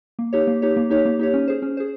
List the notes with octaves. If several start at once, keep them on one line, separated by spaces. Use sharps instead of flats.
A#3
D#4 G4 C#5
A#3
D#4 G4 C#5
A#3
D#4 G4 C#5
A#3
D#4 G4 C#5
C#4
G#4 C5
C#4
G#4 C5